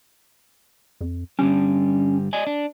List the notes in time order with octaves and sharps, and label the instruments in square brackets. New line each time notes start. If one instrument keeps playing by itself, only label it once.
[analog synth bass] F2
[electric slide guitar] G2 D3 G3 [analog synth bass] C#4
[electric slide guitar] D5 D#5 G#5
D4